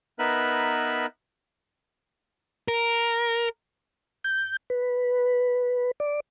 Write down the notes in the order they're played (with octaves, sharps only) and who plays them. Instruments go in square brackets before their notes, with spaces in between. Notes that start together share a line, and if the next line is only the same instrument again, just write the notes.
[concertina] B3 D#4 A#4 B4 E5 F#6
[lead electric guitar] A#4
[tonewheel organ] G6
B4
D5